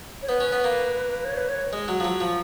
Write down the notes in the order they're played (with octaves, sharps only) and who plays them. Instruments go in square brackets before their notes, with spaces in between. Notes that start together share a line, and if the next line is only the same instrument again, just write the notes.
[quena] C#5
[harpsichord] B3 [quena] B4
[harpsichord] C#4
B3
A#3
[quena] C#5
B4
C#5
[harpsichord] G#3
F#3
F3
F#3
F3